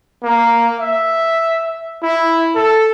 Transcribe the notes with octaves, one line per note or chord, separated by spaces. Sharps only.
A#3
E5
E4
A4